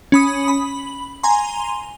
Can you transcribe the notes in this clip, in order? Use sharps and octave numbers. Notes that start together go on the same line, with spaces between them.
C#4 B5 D#6
B5
G#5 A#5 C6